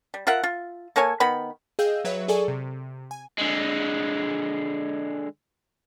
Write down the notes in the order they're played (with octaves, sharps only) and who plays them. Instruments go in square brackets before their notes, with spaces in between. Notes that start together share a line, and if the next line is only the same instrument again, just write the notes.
[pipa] G3
F4 A#4 E5 F#5
F4
A#3 A4 C#5 G#5
D#3 B3 B5
[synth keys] G#4 D#5 F5 G5 E6 G6
F#3 B4 C#5 E5
G#4 A4 D5 G#5 C#6
C3
G#5
[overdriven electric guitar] D3 G#3